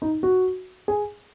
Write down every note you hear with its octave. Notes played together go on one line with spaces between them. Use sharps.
D#4
F#4
G#4